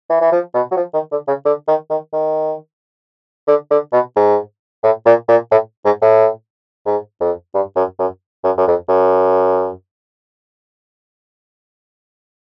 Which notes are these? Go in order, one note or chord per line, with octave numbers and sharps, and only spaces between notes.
E3
E3
F3
B2
F#3
F3
D#3
D3
C#3
D3
D#3
D#3
D#3
D3
D3
B2
G#2
A2
A#2
A#2
A2
G#2
A2
G#2
F2
G2
F#2
F#2
F#2
F#2
F2
F#2